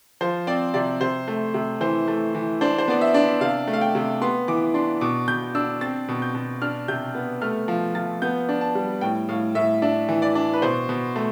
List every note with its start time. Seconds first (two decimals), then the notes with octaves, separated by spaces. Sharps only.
0.21 F3 C5
0.47 C4 D5
0.74 C3 D5
1.01 C3 C5
1.28 A3
1.54 C3
1.81 E3 C5
2.08 A3
2.35 E3
2.61 D4 C5
2.78 C5
2.88 B3 D5
3.01 E5
3.14 D4
3.41 C3 F5
3.68 A3
3.73 F5
3.81 G5
3.95 C3
4.21 B3 C6
4.48 E3 D6
4.74 D4 C6
5.01 B2 D6
5.28 B2 G6
5.55 D4 E6
5.81 C4 A6
6.08 B2
6.22 G6
6.35 B2
6.62 D4 F6
6.88 C3 G6
7.15 B3
7.42 A3 F6
7.68 F3
7.95 F3 A6
8.22 B3 G6
8.49 D4
8.61 A5
8.75 G3
9.01 A2 G5
9.29 A2 F5
9.55 A2 E5
9.82 D4 E5
10.09 E3
10.22 D5
10.35 D4
10.53 B4
10.62 B2 C5
10.89 B2
11.16 A3